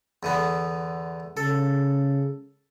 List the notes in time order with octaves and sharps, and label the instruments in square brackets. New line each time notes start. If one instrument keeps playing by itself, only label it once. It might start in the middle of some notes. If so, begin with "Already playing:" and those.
[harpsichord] E2 D3 B3
[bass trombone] C#3 [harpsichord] A4